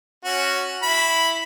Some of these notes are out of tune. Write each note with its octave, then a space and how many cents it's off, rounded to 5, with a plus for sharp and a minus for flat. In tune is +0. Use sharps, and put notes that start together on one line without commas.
C#4 +0 F#4 +0
E4 +0 B5 +0